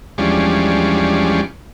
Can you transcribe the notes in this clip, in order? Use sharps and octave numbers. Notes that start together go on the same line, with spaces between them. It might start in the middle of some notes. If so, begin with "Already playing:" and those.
E2 F3 G3 G#3 C#4 D4